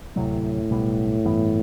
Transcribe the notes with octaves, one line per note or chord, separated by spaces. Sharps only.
D2 A2 C3 F#3
B1 B2 G3 B3
G2 E3 B3